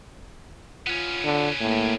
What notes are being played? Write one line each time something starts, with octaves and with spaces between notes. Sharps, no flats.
B3 C#4 F4
D3
A2 A#3